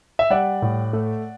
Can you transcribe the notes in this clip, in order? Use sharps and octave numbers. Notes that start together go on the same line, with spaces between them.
E5
G3 D5 F#5
A2
A3